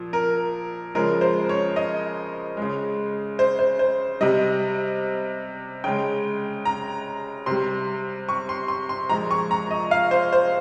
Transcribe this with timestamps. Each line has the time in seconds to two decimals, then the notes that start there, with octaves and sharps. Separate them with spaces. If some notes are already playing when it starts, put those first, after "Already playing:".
Already playing: A#2 F3
0.13 A#4
0.95 C#3 F3 G#3 A#4
1.21 C5
1.49 C#5
1.76 D#5
2.57 C#3 G#3
3.39 C5
3.59 C5
3.79 C5
4.21 C3 G3 D#5
5.84 C#3 G#3 G5
6.65 A#5
7.46 C3 G3 C6
8.29 C#6
8.49 C6
8.68 C6
8.89 C6
9.09 A#2 F3 G#3 A#5
9.31 C#6
9.51 A#5
9.71 D#5
9.91 F5
10.11 C5
10.33 C5